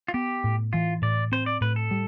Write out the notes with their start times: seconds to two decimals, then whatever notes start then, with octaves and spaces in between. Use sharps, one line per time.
0.08 F4
0.14 B3 G4
0.44 A2
0.73 E3 F4
1.02 A2 D5
1.32 C4 C5
1.46 D5
1.61 A2 B4
1.76 A4
1.91 G3